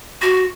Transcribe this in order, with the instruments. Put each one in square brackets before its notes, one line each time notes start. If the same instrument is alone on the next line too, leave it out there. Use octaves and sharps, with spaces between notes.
[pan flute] F#4